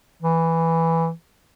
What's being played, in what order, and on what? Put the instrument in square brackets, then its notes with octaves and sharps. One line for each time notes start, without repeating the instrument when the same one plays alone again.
[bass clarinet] E3